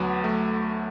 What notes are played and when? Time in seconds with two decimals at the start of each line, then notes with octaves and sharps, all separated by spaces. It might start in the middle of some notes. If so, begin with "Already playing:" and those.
Already playing: D2 F#3 B3
0.24 A3